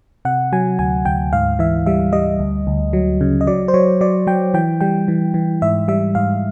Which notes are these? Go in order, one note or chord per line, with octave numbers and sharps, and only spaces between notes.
C3 F#5
F#3 G#5
D2 G#5
D2 G5
G#2 F5
E3 E5
G3 E5
G3 D#5
D2
D2
F#3
C#3
D#5
F#3 D5
C5
F#3 C#5
F#3 D5
F#3 G5
E3 G5
G3 G5
E3
E3
G#2 E5
G3 E5
G#2 F5